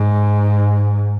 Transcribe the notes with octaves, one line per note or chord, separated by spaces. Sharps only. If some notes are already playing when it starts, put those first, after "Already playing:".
Already playing: G#2